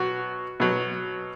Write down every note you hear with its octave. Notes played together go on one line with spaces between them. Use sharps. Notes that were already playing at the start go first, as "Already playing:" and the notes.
Already playing: B2 F#3 B3 F#4
B2 F#3